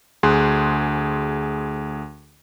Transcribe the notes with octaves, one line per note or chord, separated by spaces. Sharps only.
D2 G#4 C6 F#6